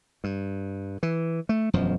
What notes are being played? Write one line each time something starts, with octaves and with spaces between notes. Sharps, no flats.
G2
E3
A3
E1 F#2 F3